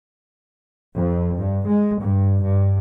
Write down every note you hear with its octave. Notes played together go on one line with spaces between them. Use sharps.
F2
G2
G#3
G2
G2